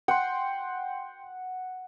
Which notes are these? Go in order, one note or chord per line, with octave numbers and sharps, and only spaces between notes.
F#5 G5 C6